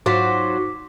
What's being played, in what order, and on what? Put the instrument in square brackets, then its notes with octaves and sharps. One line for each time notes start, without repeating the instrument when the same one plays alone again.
[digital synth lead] G#2 [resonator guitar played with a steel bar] F#3 F4 C5 [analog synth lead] F#4 [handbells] D6 B6